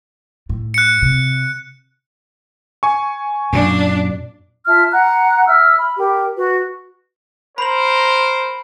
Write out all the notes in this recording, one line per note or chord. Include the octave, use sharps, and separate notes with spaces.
A2
F#6 C#7
C3
G#5 C#6
F#2 A#2 D4
F4 E5 A5 F6
F#5 A#5 F#6
E5 E6 F6
B5
G4 A#4 G5
F#4 B4
A#4 C5 B5 F#7